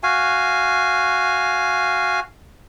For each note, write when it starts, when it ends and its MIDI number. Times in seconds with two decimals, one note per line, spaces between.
0.03 2.20 66
0.03 2.20 77
0.03 2.20 80